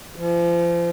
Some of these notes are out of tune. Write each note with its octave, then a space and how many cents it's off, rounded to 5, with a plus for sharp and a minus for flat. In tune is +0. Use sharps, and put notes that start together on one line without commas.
F3 -35